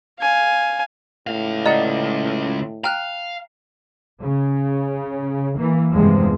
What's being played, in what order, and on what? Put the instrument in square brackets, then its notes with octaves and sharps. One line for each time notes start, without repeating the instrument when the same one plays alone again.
[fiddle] F5 G#5
[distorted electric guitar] C#2 F5 [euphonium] A2
[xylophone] D5 F#5 [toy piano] D#5 A#5 D#6
[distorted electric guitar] F5 [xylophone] G5 F6 F#6 [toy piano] A#5
[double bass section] C#3
E3 A#3
E2 G2 C3 F3 G#3